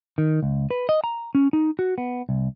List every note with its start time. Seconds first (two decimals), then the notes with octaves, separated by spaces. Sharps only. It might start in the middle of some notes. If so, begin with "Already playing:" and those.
0.18 D#3
0.43 C#2
0.71 B4
0.89 D#5
1.04 A#5
1.35 C#4
1.53 D#4
1.79 F#4
1.98 B3
2.29 C2